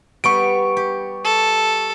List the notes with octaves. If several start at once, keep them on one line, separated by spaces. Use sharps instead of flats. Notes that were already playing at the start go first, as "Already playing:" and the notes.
G3 B3 C#6 D7
G4
A4